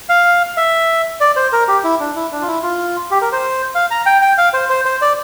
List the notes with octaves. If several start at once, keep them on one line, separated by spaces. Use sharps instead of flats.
F5
E5
D5
C5
A#4
G4
E4
D4
E4
D4
F4
E4
F4
G4
A#4
C5
F5
A#5
G5
G5
F5
C5
C5
C5
D5